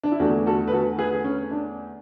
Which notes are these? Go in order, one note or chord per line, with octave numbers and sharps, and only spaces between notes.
D4
E4
E2 D3 A3 D4 F#4
F#4 A4
B4
F#4 A4
G#4 B4
C#4
D4